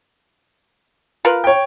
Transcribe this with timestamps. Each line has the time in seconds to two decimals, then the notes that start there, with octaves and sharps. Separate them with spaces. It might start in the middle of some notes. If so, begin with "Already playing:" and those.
1.25 F4 A#4 B4
1.44 C#5 G5